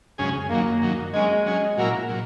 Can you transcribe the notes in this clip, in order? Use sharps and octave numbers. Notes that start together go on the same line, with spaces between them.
F#2 C#3 G#3 C#4 G#4
F#2 D#3 F#3 A#3
F#2 D#3 F#3
F#3 G#3 C#4 G#4
F#3 C#4 G#4
A#2 F#3 A#3 E4 F#4 A#4
A#2 F#3